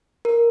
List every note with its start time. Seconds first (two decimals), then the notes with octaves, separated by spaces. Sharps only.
0.25 A#4